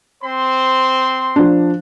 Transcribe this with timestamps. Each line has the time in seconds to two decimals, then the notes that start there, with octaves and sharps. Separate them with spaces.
0.23 C4 C5 C6
1.36 F3 D4